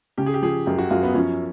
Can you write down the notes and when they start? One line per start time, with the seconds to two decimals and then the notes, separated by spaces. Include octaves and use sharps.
0.18 C#3 G4
0.26 G#4
0.34 G4
0.42 F3 G#4
0.66 F#2 G4
0.78 F#4
0.90 F#2 F4
1.03 B3
1.14 F3 C#4